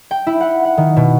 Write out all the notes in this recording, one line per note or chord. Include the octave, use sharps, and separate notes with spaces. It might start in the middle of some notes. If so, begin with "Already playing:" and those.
G5
E4
F#5
F#5
D#3
B2